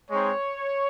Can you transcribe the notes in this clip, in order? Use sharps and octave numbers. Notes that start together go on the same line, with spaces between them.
G#3 C4 D#4 C#5